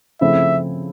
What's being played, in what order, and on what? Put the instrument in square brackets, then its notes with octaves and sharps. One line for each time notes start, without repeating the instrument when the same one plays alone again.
[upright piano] C#3 F3 A3 C4 E4 [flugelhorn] E5